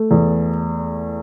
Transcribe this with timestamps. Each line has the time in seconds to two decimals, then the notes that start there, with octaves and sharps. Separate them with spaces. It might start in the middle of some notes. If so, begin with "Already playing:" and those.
Already playing: A3
0.11 E2